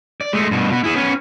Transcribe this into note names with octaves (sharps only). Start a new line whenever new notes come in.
D5
G#3 A3
G2 B2
B2 B3
E4 G#4
B3 C#4